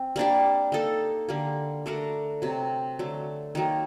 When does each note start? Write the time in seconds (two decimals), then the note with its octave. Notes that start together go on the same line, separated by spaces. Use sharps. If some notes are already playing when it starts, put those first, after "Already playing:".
Already playing: C4
0.16 G3 A#3 D4 G4
0.72 A#3 D#4 A4
1.29 D3 G3 A#3
1.86 A3 D4 F#4 A#4
2.42 C3 F#3 C4
2.99 D3 F#3 A3
3.55 D#3 F#3 A#3